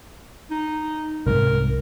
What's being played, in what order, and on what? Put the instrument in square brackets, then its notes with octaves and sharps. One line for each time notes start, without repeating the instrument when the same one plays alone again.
[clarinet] D#4
[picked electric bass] C2 G#2 [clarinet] A#4